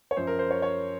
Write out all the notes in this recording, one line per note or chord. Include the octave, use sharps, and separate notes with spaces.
C#5
F#2 F3 C5
A#4
C5
C#5
C#5